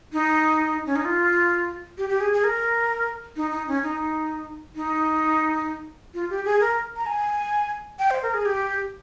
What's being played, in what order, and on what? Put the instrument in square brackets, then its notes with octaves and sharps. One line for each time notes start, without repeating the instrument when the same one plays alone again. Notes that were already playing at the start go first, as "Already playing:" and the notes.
[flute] D#4
C#4
D#4
F4
G4
G4
G#4
G#4
A#4
D#4
D#4
C#4
D#4
D#4
F4
G4
G#4
A#4
A#5
G#5
G5
C5
A#4
G#4
G4